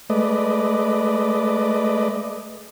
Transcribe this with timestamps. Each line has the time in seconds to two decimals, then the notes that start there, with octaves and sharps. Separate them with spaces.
0.10 G#3 A3 B4 D5 D#5